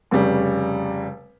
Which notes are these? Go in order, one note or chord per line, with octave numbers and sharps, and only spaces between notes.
F1 C#3 G3